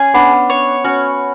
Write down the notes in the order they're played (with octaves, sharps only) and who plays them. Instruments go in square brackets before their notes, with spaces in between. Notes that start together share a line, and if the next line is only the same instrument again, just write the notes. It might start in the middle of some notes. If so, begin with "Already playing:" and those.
Already playing: [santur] C#4 [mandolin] G#4
[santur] B3 [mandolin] D4
[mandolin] C#5
[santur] C#4 [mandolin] F#4